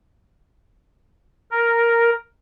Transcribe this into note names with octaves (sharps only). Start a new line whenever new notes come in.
A#4